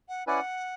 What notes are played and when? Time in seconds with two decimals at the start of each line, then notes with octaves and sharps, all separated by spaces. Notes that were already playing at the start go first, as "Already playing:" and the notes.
0.09 F#5
0.27 C#4 E4 B4 D5 F#5 G#5